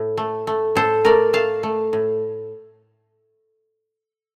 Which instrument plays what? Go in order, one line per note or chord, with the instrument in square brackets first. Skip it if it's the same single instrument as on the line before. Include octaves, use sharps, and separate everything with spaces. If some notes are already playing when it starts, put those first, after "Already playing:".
Already playing: [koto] A2
A3
A3
A2 A4 C5
A3 A#4 D5
A3 F5 A5
A3
A2